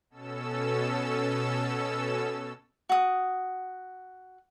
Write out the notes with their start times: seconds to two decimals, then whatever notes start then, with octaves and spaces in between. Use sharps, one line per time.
0.10 B2 C#4 A4 E6
2.89 F#4 D#6